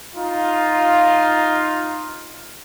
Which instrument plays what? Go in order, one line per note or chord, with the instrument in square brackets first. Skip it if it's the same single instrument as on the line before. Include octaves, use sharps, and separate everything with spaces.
[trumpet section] D#4 F4